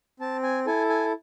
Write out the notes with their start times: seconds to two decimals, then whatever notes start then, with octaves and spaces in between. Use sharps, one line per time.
0.20 C4 A5
0.43 G#5
0.66 E4 A4 G#5
0.89 G#5